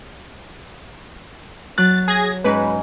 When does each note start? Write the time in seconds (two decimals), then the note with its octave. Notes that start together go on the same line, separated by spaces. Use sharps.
1.78 F#3 F#6 A6
2.08 G#4 G#6 A#6
2.44 G#2 G#3 C#4 B4